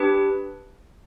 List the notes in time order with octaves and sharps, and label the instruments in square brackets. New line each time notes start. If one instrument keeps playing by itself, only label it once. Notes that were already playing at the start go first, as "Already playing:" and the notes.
Already playing: [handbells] D4 G4 B4